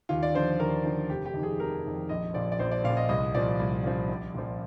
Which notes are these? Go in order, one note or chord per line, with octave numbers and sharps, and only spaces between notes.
D#2 F4
D5
D3 F3 C5
D#2 A#4
D3 F3
F1 G4
G4
F2 D#3
G#4
F1 A#4
F2 D#3
A#1 D#5
A#2 F3 D5
D5
A#1 C5
D5
A#2 F3 F5
D#5
C2 D#5
A#2 F3 D5
C2
A#2 F3
A#1
A#2 F3